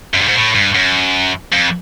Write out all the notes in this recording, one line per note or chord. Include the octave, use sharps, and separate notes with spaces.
F#2
G2
G#2
A2
G2
F#2
F2